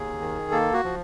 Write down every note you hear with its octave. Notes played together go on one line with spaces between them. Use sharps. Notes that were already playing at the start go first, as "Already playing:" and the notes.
Already playing: D#2 G#4
D#3
A#3 A4
F#4
F3